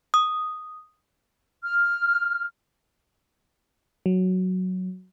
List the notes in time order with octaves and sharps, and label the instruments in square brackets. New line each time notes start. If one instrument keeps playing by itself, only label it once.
[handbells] D#6
[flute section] F6
[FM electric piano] F#3